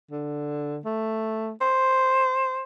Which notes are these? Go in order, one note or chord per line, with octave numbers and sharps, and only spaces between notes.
D3
A3
C5